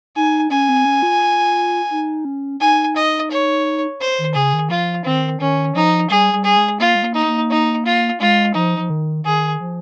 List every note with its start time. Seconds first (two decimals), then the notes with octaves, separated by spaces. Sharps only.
0.16 D#4 G#5
0.50 C#4 G#5
0.69 C4
0.85 C#4
1.03 F4
1.91 D#4
2.25 C#4
2.61 D#4 G#5
2.96 D#5
3.31 C#5
4.00 C5
4.18 D#3
4.35 C#3 G#4
4.53 D#3
4.70 F3 F4
5.05 D#3 C4
5.40 D#3 C#4
5.75 F3 D#4
6.10 G3 G#4
6.34 G3
6.44 G#4
6.57 G#3
6.80 A#3 F4
6.95 G#3
7.03 A#3
7.14 D#4
7.27 A#3
7.50 D#4
7.85 F4
8.20 G#3 F4
8.54 F3 D#4
8.79 F3
8.90 D#3
9.25 D#3 G#4
9.60 F3